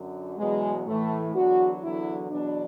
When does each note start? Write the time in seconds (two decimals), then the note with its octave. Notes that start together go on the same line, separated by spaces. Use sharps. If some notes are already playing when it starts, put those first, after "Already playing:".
Already playing: F#2 D3 F#3
0.38 E2 B2 F#3 G#3
0.86 A2 E3 A3
1.34 E2 D3 F#3 F#4
1.82 E2 D3 F#3 E4
2.30 E2 B2 F#3 D4